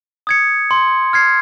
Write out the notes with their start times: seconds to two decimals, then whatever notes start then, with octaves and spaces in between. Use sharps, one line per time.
0.27 D#6 G#6 C#7
0.71 C6
1.13 F6 G#6 C7